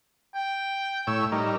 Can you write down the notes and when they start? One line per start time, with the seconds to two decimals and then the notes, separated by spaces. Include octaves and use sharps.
0.35 G5
1.07 A2 C#5 E6
1.32 G3 D#4 A#4